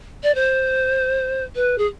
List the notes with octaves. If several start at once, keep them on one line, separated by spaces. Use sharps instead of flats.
D5
C5
B4
G#4